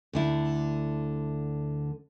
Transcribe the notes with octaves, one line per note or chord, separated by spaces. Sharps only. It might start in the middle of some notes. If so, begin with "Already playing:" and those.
D2 D3 E4